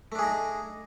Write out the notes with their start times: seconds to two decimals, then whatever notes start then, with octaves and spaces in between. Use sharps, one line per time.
0.12 A3
0.15 D4
0.19 G#4
0.22 D#4